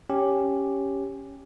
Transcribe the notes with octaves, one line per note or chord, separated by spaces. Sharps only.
C#4 G4